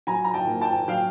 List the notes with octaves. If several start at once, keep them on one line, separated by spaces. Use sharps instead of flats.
F#3 G#5 A#5
A#5
G5 A5
A#3
G5 A5
F#3 F5 G5